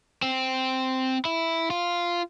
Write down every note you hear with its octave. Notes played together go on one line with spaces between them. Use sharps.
C4
E4
F4